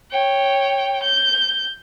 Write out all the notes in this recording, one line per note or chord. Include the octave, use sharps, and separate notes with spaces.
C#5 G5
G6